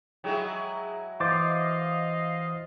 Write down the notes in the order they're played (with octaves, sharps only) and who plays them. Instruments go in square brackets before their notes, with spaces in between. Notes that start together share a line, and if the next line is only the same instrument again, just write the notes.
[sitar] F#3 G#3 E4 [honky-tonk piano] G#4 G5
[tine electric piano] E3 C5 A6 [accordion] D#5 F5 [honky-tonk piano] D6